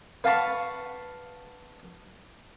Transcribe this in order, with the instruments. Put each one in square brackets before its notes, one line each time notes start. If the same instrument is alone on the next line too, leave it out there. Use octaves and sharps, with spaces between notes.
[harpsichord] B4 F5 F#5 A5 B5 C#6